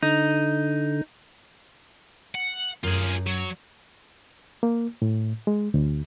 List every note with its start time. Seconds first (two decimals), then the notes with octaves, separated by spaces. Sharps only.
0.03 D3 D#4
2.35 F#5
2.84 F#2 F4 G#4
3.26 F#3
4.63 A#3
5.02 A2
5.47 G#3
5.74 D2